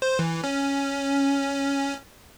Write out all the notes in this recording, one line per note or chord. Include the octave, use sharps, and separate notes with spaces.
C5
E3
C#4